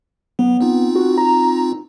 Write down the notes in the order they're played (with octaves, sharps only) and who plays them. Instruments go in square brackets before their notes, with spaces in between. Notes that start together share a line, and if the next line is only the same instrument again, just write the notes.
[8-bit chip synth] F#3 [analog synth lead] B3
[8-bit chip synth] C4 D#4 F4
[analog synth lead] F#4
A#5